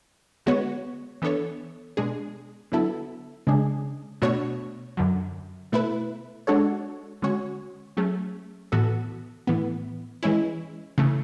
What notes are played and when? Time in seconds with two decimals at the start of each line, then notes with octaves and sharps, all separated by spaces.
0.46 D3 G#3 B3 F#4 C#5
1.22 E3 B3 D4 A4 C#5
1.97 B2 G#3 D4 G#4
2.72 D3 F#3 B3 E4 A4
3.47 C#3 G#3 D4 G#4
4.22 B2 A3 D4 F#4 C#5
4.97 F#2 D3 F#3
5.72 B2 A3 E4 B4
6.47 G#3 D4 F#4 A4 C#5
7.22 D3 G#3 C#4 F#4 C#5
7.97 F#3 A3 C#4 G#4
8.72 A2 E3 B3 F#4 A4
9.47 A2 E3 B3
10.23 E3 G#3 C#4 E4
10.98 C#3 E3 A3